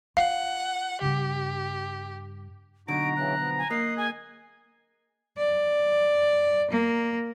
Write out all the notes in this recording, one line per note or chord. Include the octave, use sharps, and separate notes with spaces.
F4 F5 F#5
G2 C#3 G4
B1 D3 D#4 F#4 A#5 D7
C#3 E3 F#3 F#6
F3 B3
G#5
A#3 D#5 D#6 F#6 C7
G#4 G#5
D5
A#3